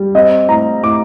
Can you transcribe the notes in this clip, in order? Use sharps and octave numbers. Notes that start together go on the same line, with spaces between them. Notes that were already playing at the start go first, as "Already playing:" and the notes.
Already playing: G3
C4 D#5
A2 A#5
A2 D6